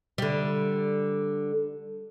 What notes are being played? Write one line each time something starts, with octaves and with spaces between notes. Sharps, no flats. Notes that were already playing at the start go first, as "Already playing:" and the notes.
D3 G3